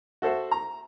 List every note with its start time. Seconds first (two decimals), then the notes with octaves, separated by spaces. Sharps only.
0.22 F#4 A4 C5 E5
0.51 A#5